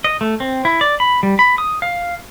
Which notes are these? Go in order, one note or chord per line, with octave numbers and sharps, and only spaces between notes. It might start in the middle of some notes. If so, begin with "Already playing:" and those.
D#5
A3
C4
E4
D5
B5
G3
B5
D#6
F5